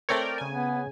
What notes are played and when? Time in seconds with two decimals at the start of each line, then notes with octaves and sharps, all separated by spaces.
0.09 A3 C4 A#4 C#5 D5 G5
0.38 C#3 G#5
0.50 B3